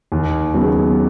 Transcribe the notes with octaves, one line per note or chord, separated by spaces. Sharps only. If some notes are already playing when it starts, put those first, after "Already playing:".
D#2
C#3 F#3 B3